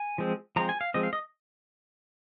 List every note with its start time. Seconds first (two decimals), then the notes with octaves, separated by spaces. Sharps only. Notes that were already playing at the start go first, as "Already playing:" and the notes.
Already playing: G#5
0.18 F3 G#3 C4
0.56 F3 G#3 C4 A#5
0.69 G#5
0.81 F5
0.94 F3 G#3 C4 D#5
1.03 F5
1.13 D#5